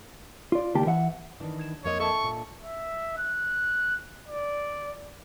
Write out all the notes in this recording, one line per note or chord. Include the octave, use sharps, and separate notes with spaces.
F4 D5
C#2 D#3 A#3 G4 A5
E3 E5 F#5
D#3 E3 D4
G#6 E7
F2 A#3 C#5 D#5
A4 E5 A5 C#6
A#2
E5
F#6
D5